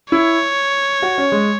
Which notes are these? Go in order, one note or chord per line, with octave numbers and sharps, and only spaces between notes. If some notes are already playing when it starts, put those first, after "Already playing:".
E4 C#5
F#4
C#4
G#3